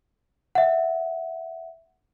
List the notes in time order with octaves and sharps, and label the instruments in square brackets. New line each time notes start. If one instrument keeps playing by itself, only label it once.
[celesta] E5 F#5